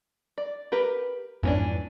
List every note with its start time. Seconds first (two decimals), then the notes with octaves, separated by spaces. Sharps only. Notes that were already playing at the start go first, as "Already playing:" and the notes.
0.38 D5
0.72 G4 A#4 B4
1.43 F2 G#2 E3 B3 C#4 D4